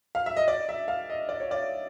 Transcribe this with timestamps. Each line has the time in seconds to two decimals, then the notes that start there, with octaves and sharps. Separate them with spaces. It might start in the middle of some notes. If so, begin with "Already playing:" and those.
0.15 F5
0.26 E5
0.37 D#5
0.48 D5
0.69 E5
0.88 F5
1.09 D#5
1.29 D5
1.40 C#5
1.51 D5